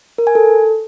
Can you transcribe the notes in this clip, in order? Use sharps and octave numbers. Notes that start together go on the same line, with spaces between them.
A#4
G#5
A4